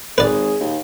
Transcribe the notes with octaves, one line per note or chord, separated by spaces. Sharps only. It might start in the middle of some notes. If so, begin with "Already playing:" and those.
G#1 G#4 B4 D5
D#2